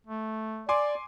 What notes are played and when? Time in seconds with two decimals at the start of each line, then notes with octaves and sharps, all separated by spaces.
0.07 A3
0.69 D5 G#5 C6 D6